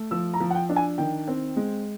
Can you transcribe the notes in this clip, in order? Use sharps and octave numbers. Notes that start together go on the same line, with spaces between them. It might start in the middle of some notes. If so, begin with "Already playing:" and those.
Already playing: A3
F3 E6
A#5
F3
F#5
G5
D4
G#5
D#3 G5
C4
G#3